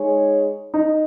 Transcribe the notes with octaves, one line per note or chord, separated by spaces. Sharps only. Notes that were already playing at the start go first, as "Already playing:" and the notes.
Already playing: G#3 D#4 G#4 C#5
D#4